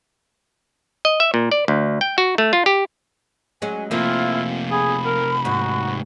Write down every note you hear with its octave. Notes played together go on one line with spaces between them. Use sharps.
D#5
E5
A#2
D5
D2
G5
F#4
A3
F4
G4
F#3 G#3 C#4 G#5
C3 F3 A3 A#3 E4 F4
G#4 B5
A#4
D#2 G#2 F#4